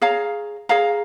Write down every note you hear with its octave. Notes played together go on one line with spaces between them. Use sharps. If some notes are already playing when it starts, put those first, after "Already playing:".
G#4 C#5 F5 A#5
G#4 C#5 F5 A#5